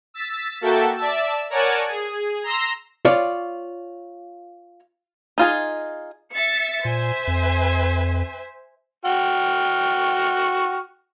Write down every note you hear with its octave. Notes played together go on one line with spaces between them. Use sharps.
E6 A6 B6
A#3 F#4 A4 E5 G5 A5
D5 E5 A5 E6
A#4 C#5 D5 F#5 G#5 A5
G#4
A#5 C6 E6 A#6
F4 C#5 D5
D#4 F4 G#4
E5 A6 C#7
A#2 C5 E5 G#5
F2
F#4 G5 F6